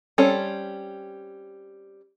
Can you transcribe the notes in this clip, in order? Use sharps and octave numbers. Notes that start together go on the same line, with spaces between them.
G3 C4 C#4 A4